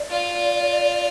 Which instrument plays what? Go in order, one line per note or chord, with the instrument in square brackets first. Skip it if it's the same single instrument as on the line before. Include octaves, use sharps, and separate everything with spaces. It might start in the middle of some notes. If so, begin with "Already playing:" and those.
Already playing: [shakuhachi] D5
[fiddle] F4